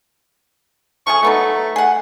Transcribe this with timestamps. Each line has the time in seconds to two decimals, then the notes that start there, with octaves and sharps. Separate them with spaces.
1.07 F3 A3 G#4 C#6
1.23 F#3 A3 B3 D#4
1.76 G#4 F#5